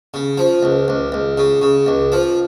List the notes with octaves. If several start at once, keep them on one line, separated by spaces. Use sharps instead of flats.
C#3
F3
C#2
C#2
C#2
C#3
C#3
C#2
F3